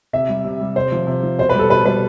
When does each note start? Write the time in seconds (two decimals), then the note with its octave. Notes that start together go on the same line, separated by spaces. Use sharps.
0.13 C3 E5
0.29 G3
0.45 C3
0.61 G3
0.75 C3 C5
0.92 F3
1.07 C3
1.23 F3
1.38 B2 C5
1.49 B4
1.54 G3
1.59 A4
1.70 B2 B4
1.85 G3 B4